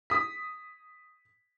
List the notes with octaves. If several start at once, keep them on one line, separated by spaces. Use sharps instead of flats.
D#6 B6